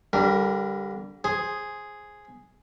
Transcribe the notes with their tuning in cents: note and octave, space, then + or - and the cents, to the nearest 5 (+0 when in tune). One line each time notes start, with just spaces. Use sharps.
D3 -25 G3 +0 A#4 +0
G#4 +0 C5 +10